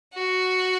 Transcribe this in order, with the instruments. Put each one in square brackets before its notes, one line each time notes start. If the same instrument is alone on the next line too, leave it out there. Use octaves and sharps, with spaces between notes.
[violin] F#4